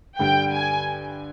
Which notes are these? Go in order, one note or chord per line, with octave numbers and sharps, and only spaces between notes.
G2 D3 G3 G5
G#5